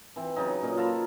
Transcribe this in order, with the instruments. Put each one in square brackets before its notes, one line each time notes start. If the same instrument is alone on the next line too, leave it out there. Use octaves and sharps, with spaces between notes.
[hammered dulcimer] E3 C4
C#3 F#3 D#4
A#2 C#4 D#5
F4 A4 A#5 B5